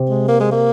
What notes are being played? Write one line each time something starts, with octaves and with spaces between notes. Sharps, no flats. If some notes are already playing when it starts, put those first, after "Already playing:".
Already playing: C3
G#3
A#3
G#3
A#3